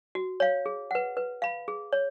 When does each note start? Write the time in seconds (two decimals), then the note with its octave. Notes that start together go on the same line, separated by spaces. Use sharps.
0.15 F#4
0.40 C#5 F5
0.66 G#4
0.91 B4 F#5
1.17 B4
1.42 F5 B5
1.68 G#4
1.93 C#5